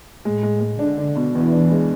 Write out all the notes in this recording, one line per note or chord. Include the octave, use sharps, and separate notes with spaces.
A2 G#3
G#3
G#3
D3 D4
D4
B2
E2 E3
D4
G#3